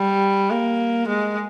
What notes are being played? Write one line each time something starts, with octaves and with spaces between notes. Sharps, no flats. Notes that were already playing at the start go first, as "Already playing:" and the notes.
Already playing: G3
A#3
G#3